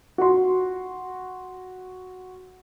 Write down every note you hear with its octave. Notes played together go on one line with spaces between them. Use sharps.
F#4 C6